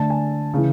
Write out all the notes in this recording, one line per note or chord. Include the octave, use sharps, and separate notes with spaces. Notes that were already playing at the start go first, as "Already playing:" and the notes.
Already playing: D3 A3 D4 A5
G#5
C#3 E3